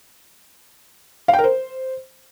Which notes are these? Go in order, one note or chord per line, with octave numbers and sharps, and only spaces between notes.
F5
G5
A#4
C5